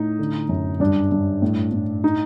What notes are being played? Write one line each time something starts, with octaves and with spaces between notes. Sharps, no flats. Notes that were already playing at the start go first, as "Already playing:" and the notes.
Already playing: A2 D#4
D3
F#2
G2 D4
G2
A2
A2
D#4